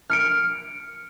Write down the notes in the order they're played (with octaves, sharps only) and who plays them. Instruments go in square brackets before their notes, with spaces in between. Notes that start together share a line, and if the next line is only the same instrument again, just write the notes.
[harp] F6 C#7 D7